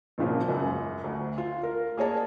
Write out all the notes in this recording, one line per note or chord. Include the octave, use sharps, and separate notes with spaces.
G#1 A#2 C#3 F3
C#2 F#2
D2
F4
A#4
A#3 G#4 C#5 A5